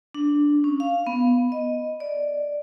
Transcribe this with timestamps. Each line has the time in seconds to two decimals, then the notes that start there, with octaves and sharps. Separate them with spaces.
0.14 D4
0.64 C#4
0.80 F5
1.07 B3
1.52 D#5
2.00 D5